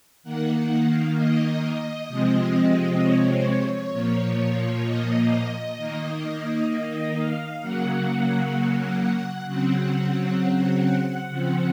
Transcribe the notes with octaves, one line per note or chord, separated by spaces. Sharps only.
D#3 A#3 F#5
F#5
F5
D#5
C3 F3 G#3 C4
C#5
A#2 F3 A#3
D#5
D#3 A#3
D#5
F5
C#3 F#3 A#3 F#5
C#3 F#3 C4 F#5
C#3 F3 C4